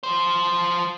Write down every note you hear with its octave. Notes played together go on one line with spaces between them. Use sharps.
F3 C5